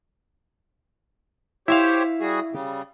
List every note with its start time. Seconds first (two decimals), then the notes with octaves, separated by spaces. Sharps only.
1.68 E4 G4 C5 C#5 E5 F5
2.21 G3 F#4 G#4
2.52 C#3 G3